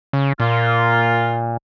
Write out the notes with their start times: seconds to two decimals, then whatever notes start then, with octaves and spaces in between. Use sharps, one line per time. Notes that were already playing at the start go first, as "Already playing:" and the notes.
0.13 C#3
0.40 A#2 A#3 F4